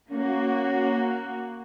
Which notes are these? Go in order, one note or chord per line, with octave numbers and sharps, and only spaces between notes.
A#3 C#4 F#4